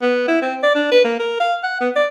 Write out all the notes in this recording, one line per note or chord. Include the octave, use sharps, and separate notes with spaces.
B3
E4
C4
D5
D4
B4
A#3
A#4
F5
F#5
B3
D5